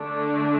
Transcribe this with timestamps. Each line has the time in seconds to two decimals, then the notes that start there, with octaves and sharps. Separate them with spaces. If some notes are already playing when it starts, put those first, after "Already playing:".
Already playing: D3 A3 D4